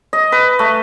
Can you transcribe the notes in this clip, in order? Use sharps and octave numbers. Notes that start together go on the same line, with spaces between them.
D#5
B4
A3